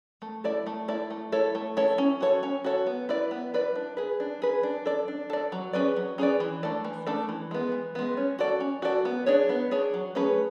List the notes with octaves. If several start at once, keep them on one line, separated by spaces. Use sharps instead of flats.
A3
E4 A4 D5
A3
E4 A4 D5
A3
E4 A4 C#5
A3
E4 A4 C#5
C#4
F#4 A4 C#5
C#4
F#4 A4 C#5
B3
E4 B4 D5
B3
E4 B4 D5
D4
G#4 B4
D4
G#4 B4
D4
A4 D5
D4
A4 D5
F#3
C#4 G#4 B4 D5
F#3
C#4 G#4 B4 D5
E3
A3 D4 A4 D5
E3
A3 D4 A4 D5
E3
G#3 B3
E3
G#3 B3
C#4
F#4 A4 D5
C#4
F#4 A4 D5
B3
D4 G#4 C#5
B3
D4 G#4 C#5
F#3
A3 C#4 G#4 B4